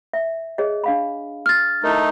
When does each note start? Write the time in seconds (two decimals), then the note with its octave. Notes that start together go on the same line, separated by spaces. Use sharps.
0.13 E5
0.58 G#4 C#5 D#5
0.84 D4 F5 B5
1.46 F6 A6
1.84 A3 D#4 E4 A#4